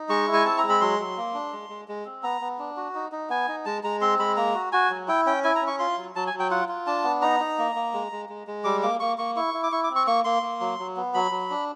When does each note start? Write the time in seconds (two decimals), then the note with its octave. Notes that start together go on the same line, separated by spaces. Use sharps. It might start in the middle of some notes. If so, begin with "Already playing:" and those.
Already playing: D#4
0.09 G#3 C#6
0.27 E4
0.33 G#5
0.45 C4 A5
0.58 A#5
0.63 G#3
0.69 B5
0.81 F#3 C6
0.99 F#3
1.17 A#3
1.34 D4
1.52 G#3
1.69 G#3
1.88 G#3
2.05 C4
2.23 B3 A#5
2.41 B3
2.59 D4
2.77 F#4
2.95 D#4
3.12 D#4
3.30 B3 G#5
3.49 D#4
3.65 G#3 A5
3.84 G#3 A#5
4.01 C4 C6
4.19 G#3 B5
4.37 A#3 A#5
4.55 F#4
4.72 F#4 G#5
4.90 F#3
5.08 E4 G5
5.26 C#4 G5
5.44 E4 G#5
5.56 A#5
5.62 C#4
5.67 C#6
5.79 F4 C6
5.97 F#3
6.16 F#3 A5
6.27 G#5
6.33 F#3
6.39 G5
6.50 F4 F#5
6.69 F4
6.87 D4 A5
7.04 B3
7.22 D#4 A#5
7.40 D#4
7.58 A#3
7.75 A#3
7.94 G#3
8.12 G#3
8.29 G#3
8.47 G#3
8.64 G3 D6
8.83 A#3 D6
9.00 A#3 C#6
9.18 A#3 C#6
9.36 E4 C#6
9.54 E4
9.63 D6
9.72 E4 C#6
9.84 D6
9.90 C4
9.96 C#6
10.07 A#3 C#6
10.25 A#3 C6
10.43 A#3
10.61 F#3
10.79 F#3
10.97 B3
11.14 F#3 B5
11.31 F#3
11.50 D4